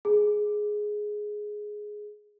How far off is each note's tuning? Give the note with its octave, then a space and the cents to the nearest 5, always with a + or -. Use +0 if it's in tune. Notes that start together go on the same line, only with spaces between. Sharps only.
G#4 +10